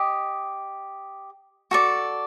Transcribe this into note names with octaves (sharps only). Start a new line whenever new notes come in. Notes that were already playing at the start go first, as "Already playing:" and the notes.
Already playing: G4 D#5
F#4 A4 D5